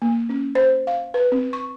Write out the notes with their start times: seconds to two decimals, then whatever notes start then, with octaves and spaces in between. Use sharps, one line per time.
0.02 A#3
0.29 C#4
0.55 C5
0.87 F5
1.14 B4
1.32 C4
1.53 C#6